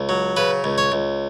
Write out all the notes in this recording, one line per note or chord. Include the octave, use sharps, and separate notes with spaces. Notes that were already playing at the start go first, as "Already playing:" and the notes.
Already playing: C#2
F#3
C#3 B4
C#2
C#5
C#2